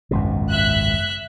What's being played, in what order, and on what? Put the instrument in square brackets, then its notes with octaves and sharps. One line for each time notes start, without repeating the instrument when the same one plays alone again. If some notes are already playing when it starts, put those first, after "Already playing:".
[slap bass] G#1 C#2 B2 [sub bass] F#2
[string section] E5 F#6